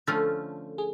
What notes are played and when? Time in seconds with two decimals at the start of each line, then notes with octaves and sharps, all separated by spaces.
0.07 D3 F3 A3 C#4 F4 A4
0.78 G#4